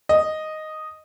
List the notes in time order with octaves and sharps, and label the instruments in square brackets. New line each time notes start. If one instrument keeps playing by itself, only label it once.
[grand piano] D#5